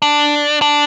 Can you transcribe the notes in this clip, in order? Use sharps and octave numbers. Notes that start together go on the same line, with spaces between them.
D4
D4